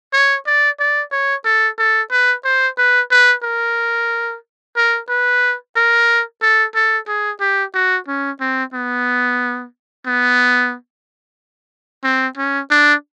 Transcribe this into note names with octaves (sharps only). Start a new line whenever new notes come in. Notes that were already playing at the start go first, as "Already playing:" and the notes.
C#5
D5
D5
C#5
A4
A4
B4
C5
B4
B4
A#4
A#4
B4
A#4
A4
A4
G#4
G4
F#4
C#4
C4
B3
B3
C4
C#4
D4